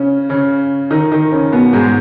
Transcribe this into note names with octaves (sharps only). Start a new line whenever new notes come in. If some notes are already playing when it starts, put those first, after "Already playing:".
Already playing: C#3 C#4
C#3 C#4
D#3 D#4
D#3 D#4
C#3 C#4
B2 B3
G#2 G#3